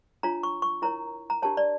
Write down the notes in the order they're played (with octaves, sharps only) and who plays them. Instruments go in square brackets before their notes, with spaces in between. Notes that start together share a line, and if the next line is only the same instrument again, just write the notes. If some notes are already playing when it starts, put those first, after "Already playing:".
[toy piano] D4 F4 C#5 A#5
C#6
C#6
E4 A#4 C#5 A#5
A#5
D4 G4 A#4 C#5 A5
D5